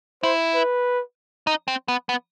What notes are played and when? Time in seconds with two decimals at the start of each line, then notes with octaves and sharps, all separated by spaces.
0.23 E4 C5
0.55 B4
1.47 D#4
1.68 C4
1.88 B3
2.09 B3